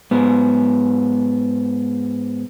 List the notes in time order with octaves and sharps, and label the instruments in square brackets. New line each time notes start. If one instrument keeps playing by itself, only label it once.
[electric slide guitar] G#2 B3